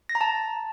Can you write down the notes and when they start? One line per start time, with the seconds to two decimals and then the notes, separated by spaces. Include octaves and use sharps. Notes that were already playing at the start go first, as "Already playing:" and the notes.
0.09 A#6
0.15 A#5
0.21 A5